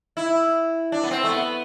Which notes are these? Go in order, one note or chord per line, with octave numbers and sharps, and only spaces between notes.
E4
D4
B3
C4
A3
B3